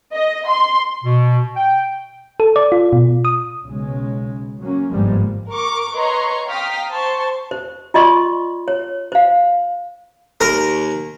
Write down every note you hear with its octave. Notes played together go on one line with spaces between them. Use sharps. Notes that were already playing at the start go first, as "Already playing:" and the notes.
D#5
C6
B2
G5
A4
D5
F4
B2
D#6
B1 C#3 G#3
F#3 A#3 C#4
G1 G#2 F3 G3 G#3 A#3
A#4 C#6 D6
B4 C#5 D#5 A#5 C6 C#6
F5 G5 A#5 D#6 F6 B6
C5 A5 C6 C#6
C5
F4 D5 D#5 C6 C#6
C#5
C5 F5
D#2 A#4